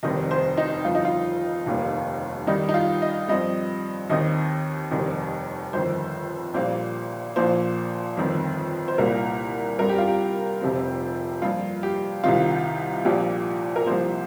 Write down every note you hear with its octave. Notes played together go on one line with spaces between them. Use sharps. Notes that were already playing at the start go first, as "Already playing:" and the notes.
F1 D#2 D#3 G3 C4 D#5
C5
D#4
G1 F2 F3 F4
D#4
F4
F1 D#2 D#3 G3 A#3
G2 D#3 G3 D#4
D#4
F4
D#5
G2 F3 C4 D#5
D#2 D#3 C4 D#5
F1 D#2 D#3 G3 C4
G1 F2 D#3 C5
A#1 A#2 G3 A#3 C5
A#1 A#2 F3 A#3 C5
G1 F2 D#3 C4
C5
C2 A#2 A#3 A#4
G2 G3 C4 A#4
G4
F4
G4
F1 F2 C3 F3 C4
G2 F3 A#3 F4
G4
C2 C3 D#3 C4 F4
A#1 A#2 F3 A#3 G4
A#4
C2 C3 F3 A#3 C5